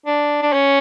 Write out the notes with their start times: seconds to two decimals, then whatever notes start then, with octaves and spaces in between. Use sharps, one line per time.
0.06 D4
0.42 D4
0.52 C#4